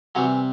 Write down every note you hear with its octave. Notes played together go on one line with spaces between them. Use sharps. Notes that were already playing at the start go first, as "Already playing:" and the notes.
C3 E3 F#3 G3 F#4